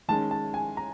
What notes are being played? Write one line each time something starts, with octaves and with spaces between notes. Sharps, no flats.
D#3 G#3 C#4 A5
A5
G#5
A#5